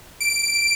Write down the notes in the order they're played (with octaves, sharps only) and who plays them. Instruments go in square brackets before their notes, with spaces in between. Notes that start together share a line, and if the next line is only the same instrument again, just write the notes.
[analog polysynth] D7